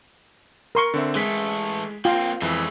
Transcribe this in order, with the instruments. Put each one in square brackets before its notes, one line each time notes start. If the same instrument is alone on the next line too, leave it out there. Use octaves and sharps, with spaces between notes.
[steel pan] A#4 C6 C#6
[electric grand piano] D3 C4 E5
[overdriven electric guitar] E3 A3 [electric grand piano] G#3 B6
[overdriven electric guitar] A#3 C4 [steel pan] F4 [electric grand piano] G5
[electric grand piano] F2 E3 [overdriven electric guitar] G#3 E5